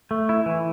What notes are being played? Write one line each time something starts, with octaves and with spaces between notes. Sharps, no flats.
A3
E4
E3